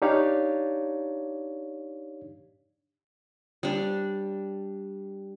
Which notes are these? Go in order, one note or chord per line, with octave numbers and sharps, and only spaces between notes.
D4 D#4 G4 C#5 D5 F5
G3 D4